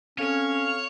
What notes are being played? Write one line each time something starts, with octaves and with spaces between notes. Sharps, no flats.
C4 C#4 A4 C#5 F5